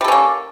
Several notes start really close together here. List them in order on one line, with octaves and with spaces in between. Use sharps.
G3 A4 C#4 A#3